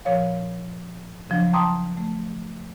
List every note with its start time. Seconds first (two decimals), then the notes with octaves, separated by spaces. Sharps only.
0.05 A#2 F3 C#5 F5
1.30 C#3 F3 F#3 D4
1.53 G5 A5 A#5 C6 D6 D#6
1.97 A3